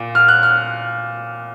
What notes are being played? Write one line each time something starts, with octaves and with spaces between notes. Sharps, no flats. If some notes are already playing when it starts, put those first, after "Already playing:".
Already playing: A#2
F6
F#6
F6